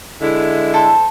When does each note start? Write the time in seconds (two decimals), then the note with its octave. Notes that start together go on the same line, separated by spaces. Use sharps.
0.21 D3 G#3 E4
0.74 A4 C5